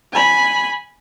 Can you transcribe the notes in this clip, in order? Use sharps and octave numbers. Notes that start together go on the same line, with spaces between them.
G#5 B5